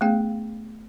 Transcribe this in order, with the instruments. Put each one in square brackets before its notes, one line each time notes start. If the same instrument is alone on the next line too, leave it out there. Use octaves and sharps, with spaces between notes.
[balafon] A3 B3 C#4 G#4 F5 G5